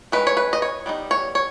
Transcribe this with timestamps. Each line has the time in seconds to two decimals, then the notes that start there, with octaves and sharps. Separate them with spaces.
0.12 D#3 G#3 C#4 B4
0.27 C#5
0.37 B4
0.53 D#5
0.62 C#5
0.86 G3 B3 D#4
1.11 C#5
1.35 C#5